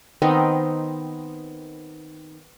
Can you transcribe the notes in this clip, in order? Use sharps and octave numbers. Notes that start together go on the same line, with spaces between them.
D#3 B3 C4 D#4